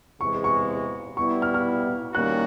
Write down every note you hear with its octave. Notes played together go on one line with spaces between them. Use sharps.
E2 C3 E3 G#3 C#6
C#6
G3 B3 E4 C#6
F6
F6
D#3 G3 A#3 C#4 F#4 F#6